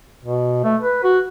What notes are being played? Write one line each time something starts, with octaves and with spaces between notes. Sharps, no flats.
B2
A3
B4
F#4